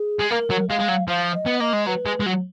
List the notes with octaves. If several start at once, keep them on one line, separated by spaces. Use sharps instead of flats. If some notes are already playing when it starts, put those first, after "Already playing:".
Already playing: G#4
G#3
A#3 A#4
F#3
G#3 F5
G#3
F#3
F3 F5
D#5
B3
A#3 D#5
G#3
F#3 B4
G#3
G#3
F#3